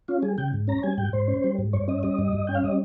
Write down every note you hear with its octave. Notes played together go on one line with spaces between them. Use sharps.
C#4 F4
G3 G#4
C#3 G5
G#2
C#4 A#5
G3 G#5
G#2 G5
G#2 C5
C#4
G3
G#2
G2 C#5
C#4 D#5
G3 D#5
G2
G2
C#4 G5
F5
G3 D#5